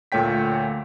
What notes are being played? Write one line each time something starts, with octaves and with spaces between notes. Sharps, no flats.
D2 A#2 A3 C#5 G5 B6